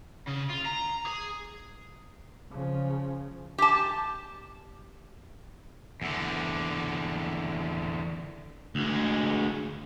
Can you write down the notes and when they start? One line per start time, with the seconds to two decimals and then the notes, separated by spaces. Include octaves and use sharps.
0.27 C#3
0.50 F4
0.66 A#5
1.06 G#4
2.51 C#3 F3
3.58 G4 A5
6.02 E2 D3
8.75 D2 G#3